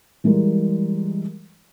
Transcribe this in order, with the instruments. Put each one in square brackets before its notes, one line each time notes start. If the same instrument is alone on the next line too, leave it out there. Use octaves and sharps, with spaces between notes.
[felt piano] E3 G3 G#3 A#4